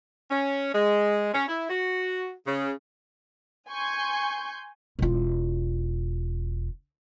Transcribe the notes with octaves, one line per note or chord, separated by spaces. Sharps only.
C#4
G#3
C#4
E4
F#4
C#3
G#5 C6 C#6 G6
E1 F4